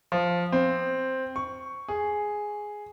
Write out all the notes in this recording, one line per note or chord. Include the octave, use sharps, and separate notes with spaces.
F3
C4
C#6
G#4